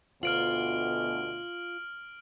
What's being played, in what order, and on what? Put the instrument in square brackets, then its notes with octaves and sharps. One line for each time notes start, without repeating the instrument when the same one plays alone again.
[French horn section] D2 B2 [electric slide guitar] F4 [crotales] F6 D7 F#7